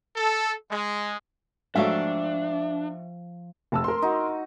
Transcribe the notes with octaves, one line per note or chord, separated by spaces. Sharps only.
A4
G#3
G#2 F3 F#3 A3 D4 E5 F5 G5
F1 A5 E6
A#4 C6
D#4 F#4